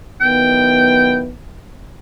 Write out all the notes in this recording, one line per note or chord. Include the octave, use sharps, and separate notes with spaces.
D#3 F#3 B3 E4 G5